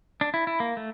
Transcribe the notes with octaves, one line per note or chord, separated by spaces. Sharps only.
D4
E4
E4
A#3
A3